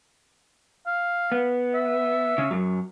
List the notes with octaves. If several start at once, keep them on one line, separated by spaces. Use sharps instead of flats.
F5
B3
E5
C#3 C#4
F#2 F#3